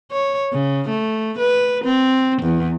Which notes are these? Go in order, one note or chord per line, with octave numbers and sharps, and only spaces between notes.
C#5
C#3
A3
B4
C4
E2